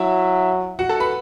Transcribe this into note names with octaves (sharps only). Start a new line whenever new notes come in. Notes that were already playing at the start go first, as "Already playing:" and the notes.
Already playing: F#3 E4 E5
F#4 F#5
A4 A5
B4 B5